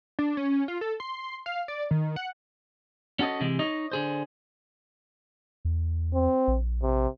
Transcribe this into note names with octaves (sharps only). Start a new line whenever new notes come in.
D4
C#4
F4
A4
C6
F5
D5
D#3
F#5
C#4 F#4 A4 D#5
C3 E3 G#3
D#4 C#5 D#5
D3 G#4 C5
E2
C4
A#1
C3